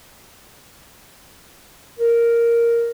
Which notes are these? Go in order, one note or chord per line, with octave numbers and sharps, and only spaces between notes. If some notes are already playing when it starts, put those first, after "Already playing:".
A#4